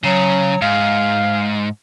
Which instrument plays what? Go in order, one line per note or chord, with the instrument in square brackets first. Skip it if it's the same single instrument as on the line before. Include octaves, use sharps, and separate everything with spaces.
[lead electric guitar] C#3 [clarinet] F#3
[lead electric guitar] G#2 [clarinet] F5